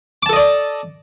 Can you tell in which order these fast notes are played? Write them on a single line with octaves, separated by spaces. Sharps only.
D6 A5 A4 D#5 D5